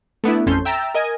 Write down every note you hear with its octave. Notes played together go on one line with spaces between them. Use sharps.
A3 B3 D4 E4
A1 F2 C#4 A4 C6 G6
E5 G5 A#5 E6 A6
A#4 D#5 G#5